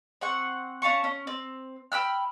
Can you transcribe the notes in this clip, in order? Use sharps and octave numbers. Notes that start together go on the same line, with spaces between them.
C4 F#5 C#6
C#4 F5 A5 C#6
C#4
C4
G5 B5 E6 F6